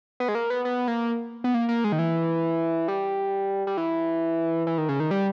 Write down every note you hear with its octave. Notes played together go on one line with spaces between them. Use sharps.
B3
G#3
A#3
B3
B3
A#3
B3
A#3
A#3
G#3
D#3
E3
G3
G3
E3
E3
D#3
C#3
D#3
G3